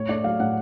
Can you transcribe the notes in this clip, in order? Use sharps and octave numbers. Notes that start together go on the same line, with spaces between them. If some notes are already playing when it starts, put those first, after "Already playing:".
Already playing: A2 C#5
A3 D5
F#3 F5
A2 F#5